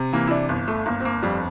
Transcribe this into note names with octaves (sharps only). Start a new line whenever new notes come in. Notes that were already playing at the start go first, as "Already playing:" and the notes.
Already playing: C3
E3 A#3
E4
D4
G1
A3
G1 A#3
C4
A#3
F2 G3